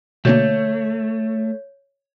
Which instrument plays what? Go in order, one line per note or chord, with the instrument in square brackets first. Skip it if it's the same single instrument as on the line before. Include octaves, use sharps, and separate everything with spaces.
[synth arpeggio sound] B2 D3 A#3 [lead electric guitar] A3 [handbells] C#5 G6